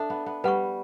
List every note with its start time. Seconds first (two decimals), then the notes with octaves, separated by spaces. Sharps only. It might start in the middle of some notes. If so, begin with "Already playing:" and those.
Already playing: D4 A4 E5
0.10 B3
0.26 B3
0.44 G3 B4 F#5 C#6